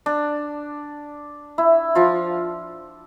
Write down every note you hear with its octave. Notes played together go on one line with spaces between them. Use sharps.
D4
E4
F3 F4